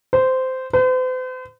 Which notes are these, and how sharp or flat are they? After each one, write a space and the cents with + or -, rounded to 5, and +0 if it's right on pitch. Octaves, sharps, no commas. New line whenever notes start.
C5 -15
C5 -45